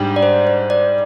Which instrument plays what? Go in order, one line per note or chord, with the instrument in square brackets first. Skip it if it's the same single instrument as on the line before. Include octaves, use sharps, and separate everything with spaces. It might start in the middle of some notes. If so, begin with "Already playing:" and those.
Already playing: [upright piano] G#2 G3 D4 G4
[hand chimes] D5
C5
C5
D5